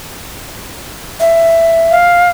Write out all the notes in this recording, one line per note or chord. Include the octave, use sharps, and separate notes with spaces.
E5
F5